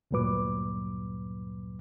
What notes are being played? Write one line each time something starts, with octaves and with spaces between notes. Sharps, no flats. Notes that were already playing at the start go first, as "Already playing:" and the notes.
D2 G2 A#2 F#3 B4 D6